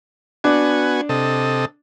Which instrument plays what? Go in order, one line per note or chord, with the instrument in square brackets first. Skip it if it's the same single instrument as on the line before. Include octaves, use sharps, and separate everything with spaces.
[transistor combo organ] B3 F#4 G#5 [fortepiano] D4
[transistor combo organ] C3 A4 D#5